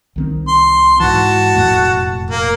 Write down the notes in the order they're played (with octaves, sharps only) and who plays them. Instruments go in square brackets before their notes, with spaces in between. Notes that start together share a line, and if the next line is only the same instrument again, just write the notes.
[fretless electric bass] C2 D#3 C4
[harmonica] C6
[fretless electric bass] G#2 E3 [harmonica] F#4 A5
[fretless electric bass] E1 F2 A2
[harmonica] A#3